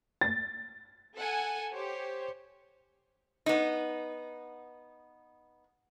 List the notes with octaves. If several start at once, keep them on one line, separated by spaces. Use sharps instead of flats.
A6
A4 F#5 G#5
G4 C5 C#5
B3 D#4